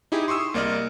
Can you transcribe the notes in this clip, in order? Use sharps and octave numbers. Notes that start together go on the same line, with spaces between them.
D#4 E4 G4 G#4
C6 C#6 D#6 E6
C2 A#3 D5 D#5 F6